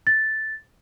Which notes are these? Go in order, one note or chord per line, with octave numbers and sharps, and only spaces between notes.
A6